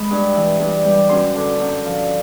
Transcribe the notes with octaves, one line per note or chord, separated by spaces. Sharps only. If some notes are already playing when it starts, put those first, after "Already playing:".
Already playing: G#3 B5
G2
E3
G2
G3
F#2 C6
D3
F#2
F3